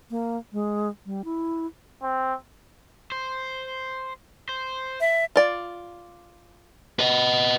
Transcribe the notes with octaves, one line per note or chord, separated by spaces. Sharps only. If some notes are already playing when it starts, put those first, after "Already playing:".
A#3
G#3
G3
E4
C4
C5
C5
E5
F4 D5
B4 D#5